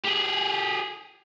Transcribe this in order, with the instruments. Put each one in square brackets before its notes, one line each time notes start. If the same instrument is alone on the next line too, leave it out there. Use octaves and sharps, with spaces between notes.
[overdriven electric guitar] G4 G#4